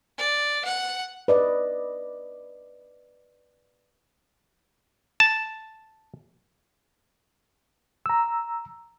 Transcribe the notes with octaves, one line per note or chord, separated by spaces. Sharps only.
D5
F#5
B4 D5 D#5
A5
A#5 E6